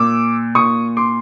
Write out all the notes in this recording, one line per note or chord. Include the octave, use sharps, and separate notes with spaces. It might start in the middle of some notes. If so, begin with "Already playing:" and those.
Already playing: A#2 D6 E6
A#2 C#6 D#6
C6 D6